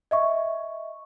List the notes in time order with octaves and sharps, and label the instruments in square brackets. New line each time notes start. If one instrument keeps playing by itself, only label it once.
[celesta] D#5 E5 C#6